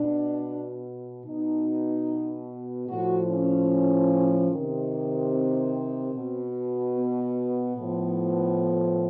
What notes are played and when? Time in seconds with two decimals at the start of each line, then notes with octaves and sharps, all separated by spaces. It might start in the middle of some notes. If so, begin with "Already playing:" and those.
Already playing: B2 D4
1.26 B2 D#4
2.89 A2 F3 F#4
3.29 C#4
4.52 C3 D#3
5.33 C4
6.14 B2
6.96 B3
7.77 A2 F3